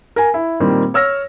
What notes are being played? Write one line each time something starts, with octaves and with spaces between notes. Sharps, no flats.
A#4 G#5
E4
A#2 D#3 G3 A#3 C4
C#5 E6 F6 A#6